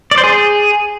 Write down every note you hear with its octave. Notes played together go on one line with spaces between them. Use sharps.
D5
C5
G#4